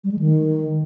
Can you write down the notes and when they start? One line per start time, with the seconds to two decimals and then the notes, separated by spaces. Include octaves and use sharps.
0.04 G3
0.12 G#3
0.19 D#3